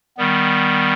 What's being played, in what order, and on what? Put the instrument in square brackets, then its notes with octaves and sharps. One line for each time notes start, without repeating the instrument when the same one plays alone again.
[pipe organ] D#3 G3 B3